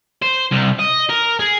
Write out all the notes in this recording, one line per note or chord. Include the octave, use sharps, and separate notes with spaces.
C5
C2
D#5
A#4
G#4